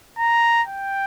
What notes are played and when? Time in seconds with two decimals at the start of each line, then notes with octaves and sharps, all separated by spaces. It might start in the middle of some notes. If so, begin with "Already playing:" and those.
0.18 A#5
0.67 G5